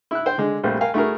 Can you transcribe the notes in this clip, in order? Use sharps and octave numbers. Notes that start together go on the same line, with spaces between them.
E4 E6 F#6
C5 G5
D3 G#3
A#1 G3 A3 C4 G4
A#4 F5 G5 G#5
A3 E4 F#4 G#4 A#4